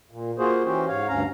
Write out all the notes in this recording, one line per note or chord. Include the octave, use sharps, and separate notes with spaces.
A#2
A#3 F4 F#4 G#4 C5
E3 C#4 F#4 G4 C5
G#2 C#5 F5
D2 G2 C#4 F5 A#5